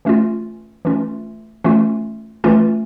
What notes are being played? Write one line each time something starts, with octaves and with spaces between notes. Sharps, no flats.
E3 A3 C#4 F4
E3 A3 C#4 F4
E3 A3 C#4 F4
E3 A3 C#4 F4